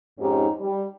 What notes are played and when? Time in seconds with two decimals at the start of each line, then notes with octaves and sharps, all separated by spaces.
0.19 F2 G#2 C#4 D#4 G4
0.61 G3